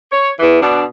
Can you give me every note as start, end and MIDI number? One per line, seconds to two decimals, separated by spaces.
0.10 0.28 73
0.39 0.59 40
0.39 0.59 52
0.60 0.82 47
0.60 0.82 62